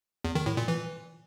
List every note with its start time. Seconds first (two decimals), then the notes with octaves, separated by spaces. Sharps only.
0.24 E2
0.35 D#3
0.46 A2
0.57 A#2
0.68 E3